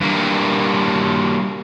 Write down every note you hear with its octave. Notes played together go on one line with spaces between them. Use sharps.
G2 A#3